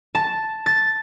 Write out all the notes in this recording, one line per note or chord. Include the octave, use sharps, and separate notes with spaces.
A5
A6